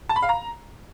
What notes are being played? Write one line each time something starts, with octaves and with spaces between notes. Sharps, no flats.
A5
B5
F5
A#5